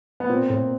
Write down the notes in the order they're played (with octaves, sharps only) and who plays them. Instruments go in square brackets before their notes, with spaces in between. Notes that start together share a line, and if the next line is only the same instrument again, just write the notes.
[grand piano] B3
[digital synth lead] A#2 [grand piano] C4
[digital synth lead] A2
A#2